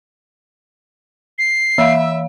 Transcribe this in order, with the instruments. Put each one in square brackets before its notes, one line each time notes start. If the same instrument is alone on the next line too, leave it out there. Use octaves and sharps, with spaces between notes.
[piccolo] C7
[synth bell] E3 F5 [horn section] E5